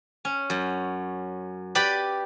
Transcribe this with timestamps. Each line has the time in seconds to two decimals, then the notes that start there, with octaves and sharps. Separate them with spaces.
0.25 C#4
0.50 F#2
1.75 G4 B4 D5 B5